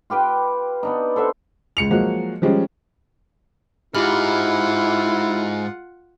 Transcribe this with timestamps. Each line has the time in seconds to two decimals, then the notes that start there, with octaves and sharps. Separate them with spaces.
0.10 F4 G4 B4 G5
0.83 B3 D4 D#4
1.16 A4 C5 E5 F#5
1.77 C#2 C#7 F7
1.91 F3 F#3 G#3 A#3 F#4
2.42 F3 G3 G#3 C#4
3.95 G#2 E4 F4 G4 F#5 B5 F6